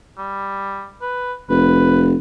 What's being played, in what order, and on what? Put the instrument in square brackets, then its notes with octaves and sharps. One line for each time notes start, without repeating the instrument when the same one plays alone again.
[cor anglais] G3
B4
[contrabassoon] F1 [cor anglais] B4